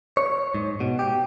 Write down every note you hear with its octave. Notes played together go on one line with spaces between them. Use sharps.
C#5
G#2
B2
G4